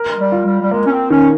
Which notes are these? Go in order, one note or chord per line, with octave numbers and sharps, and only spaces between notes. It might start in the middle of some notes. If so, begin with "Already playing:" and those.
Already playing: A#4
G#3
G3
F4
G3
G3
G#3 A#3
C#4
C4
D#3 C#4